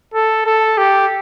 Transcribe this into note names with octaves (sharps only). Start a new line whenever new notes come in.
A4
A4
G4